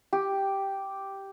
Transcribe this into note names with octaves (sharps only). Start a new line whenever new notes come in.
G4